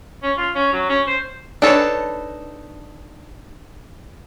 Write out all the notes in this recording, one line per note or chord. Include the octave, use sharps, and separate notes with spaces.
C#4
F4
C#4
F#3
C#4
C5
D4 D#4 A4 B4 C#5